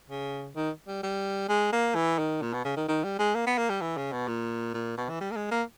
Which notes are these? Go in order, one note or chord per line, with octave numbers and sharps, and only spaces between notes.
C#3
D#3
G3
G3
G#3
A#3
E3
D#3
A#2
B2
C#3
D#3
D#3
G3
G#3
A#3
B3
A#3
G3
E3
C#3
B2
A#2
A#2
B2
E3
G3
A#3
G#3
A#3